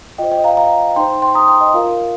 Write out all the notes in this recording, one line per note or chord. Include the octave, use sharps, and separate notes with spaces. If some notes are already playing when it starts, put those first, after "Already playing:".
F4 C5 D#5 G5
D#5 G5
F5 A#5
F5 A#5
D#4 C5 G5 C6
G5 C6
A#5 D#6
G5 C6
D#5 G5
F4 A#4 F5